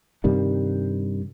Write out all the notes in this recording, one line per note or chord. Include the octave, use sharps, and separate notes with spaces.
G2 C3 D#3 G3